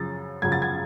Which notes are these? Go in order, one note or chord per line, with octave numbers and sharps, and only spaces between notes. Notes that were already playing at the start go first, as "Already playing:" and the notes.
Already playing: F#2 C#3 F3 A6
F#2 C#3 F3 G#6
A6
G#6